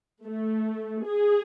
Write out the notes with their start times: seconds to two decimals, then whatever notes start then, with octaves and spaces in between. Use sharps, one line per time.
0.25 A3
1.05 G#4